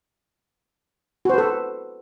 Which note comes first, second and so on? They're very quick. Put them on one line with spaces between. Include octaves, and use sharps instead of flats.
F#4 C5 B4 A4